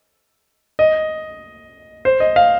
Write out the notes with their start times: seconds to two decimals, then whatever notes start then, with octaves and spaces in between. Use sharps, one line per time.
0.79 D#5
2.05 C5
2.20 D#5
2.36 F5